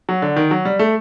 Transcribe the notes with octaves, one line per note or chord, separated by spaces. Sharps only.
F#3
D3
D#3
F#3
G3
A3